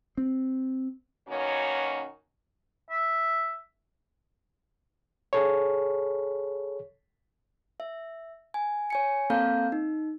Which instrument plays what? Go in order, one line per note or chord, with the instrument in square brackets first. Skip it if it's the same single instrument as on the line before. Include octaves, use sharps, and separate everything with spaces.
[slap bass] C4
[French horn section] B2 D#3 A#3 C#4 F#4 C#5
[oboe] E5
[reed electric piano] G#4 A4 C#5
[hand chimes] E5
G#5
C#5 G#5 C#7
A#3 C4 A4 F5 A#5 G6
D#4